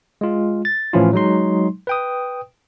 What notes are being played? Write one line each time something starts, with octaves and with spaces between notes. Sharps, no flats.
G#3 F4
A6
A2 E3 F3 C#4 E4 F4
F#3 G#3 D#4 C6
B4 G5 D#6